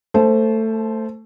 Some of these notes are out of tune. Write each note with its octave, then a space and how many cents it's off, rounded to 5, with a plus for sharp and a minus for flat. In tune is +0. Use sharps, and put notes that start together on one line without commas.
A3 +15 C5 +0 A5 -20